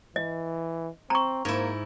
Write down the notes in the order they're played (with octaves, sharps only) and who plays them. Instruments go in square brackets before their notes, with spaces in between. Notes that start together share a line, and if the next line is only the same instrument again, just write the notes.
[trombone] E3 [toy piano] D#5
[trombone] C4 [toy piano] A#5 C#6
[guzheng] G#2 E4 [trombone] A#3